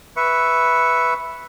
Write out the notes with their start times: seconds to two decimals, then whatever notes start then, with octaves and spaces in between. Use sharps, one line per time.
0.16 B4 E5 C#6